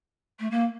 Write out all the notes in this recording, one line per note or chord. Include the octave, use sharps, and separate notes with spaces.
A3
A#3